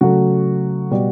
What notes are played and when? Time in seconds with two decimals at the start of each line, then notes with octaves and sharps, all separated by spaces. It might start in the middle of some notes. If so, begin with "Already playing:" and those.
0.01 C#3 F#3 A3 F#4
0.91 B2 G3